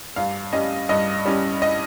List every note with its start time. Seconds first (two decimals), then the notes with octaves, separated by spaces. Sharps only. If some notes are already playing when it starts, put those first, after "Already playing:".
0.16 G2 F5
0.52 G3 C#4 D#5
0.89 G2 D#5
1.26 G3 C#4
1.62 D#5